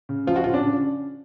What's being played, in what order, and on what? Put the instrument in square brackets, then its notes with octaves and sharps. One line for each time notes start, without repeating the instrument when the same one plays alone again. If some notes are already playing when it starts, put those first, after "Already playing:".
[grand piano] C#3
[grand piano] F3 [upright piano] F4
[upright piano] F#4
[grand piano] C#3 [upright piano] F4
[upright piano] D4
[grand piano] C#3